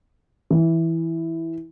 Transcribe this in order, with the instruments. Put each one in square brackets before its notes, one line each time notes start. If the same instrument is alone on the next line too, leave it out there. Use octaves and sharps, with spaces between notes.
[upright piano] E3